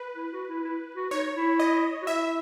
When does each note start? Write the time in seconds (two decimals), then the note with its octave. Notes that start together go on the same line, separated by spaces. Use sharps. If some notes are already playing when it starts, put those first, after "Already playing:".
Already playing: B4
0.16 E4
0.33 F#4
0.49 E4
0.64 E4
0.96 F#4
1.11 D#4 C#5
1.36 E4
1.59 D#5
2.02 F#4
2.07 E4 E5